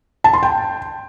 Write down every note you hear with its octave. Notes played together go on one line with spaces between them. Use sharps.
A5
C6
G5